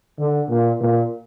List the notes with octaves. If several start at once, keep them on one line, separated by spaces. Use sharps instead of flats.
D3
A#2
A#2